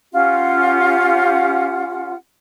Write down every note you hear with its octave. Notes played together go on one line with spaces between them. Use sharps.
C#4 F4 G4 F#5